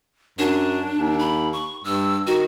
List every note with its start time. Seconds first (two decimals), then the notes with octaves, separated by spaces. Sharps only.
0.39 F#2 D4
0.98 D#2
1.19 B5
1.53 C#6
1.84 G2 E6
2.27 D#3 F#4